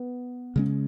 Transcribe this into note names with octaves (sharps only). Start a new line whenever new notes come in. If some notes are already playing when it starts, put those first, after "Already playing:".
Already playing: B3
C#3 G#3 C#4